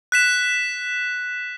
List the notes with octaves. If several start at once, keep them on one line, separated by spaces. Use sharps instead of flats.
F#6 B6 E7